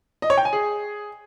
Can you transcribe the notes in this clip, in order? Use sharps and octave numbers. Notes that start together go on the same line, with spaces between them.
D#5
C#5
G5
G#5
G#4